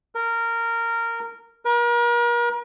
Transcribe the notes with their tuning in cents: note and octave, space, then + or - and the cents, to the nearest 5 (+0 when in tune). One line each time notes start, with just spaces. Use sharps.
A#4 -15
A#4 +40